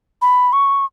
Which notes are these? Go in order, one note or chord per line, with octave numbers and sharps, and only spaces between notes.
B5
C#6